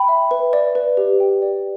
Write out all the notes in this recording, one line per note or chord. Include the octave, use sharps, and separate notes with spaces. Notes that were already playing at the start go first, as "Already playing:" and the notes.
Already playing: G5 B5
E5
B4
D5
B4
G4
G5
D5